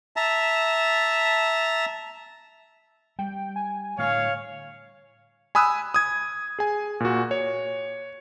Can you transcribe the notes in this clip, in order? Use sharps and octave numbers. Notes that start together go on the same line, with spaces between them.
E5 A5 A#5
G3 G5
G#5
A2 D3 A3 C#5 F5
G#5 B5 D#6 E6 F#6
D#6 G#6
G#4 G#5
A#2 F#4
C#5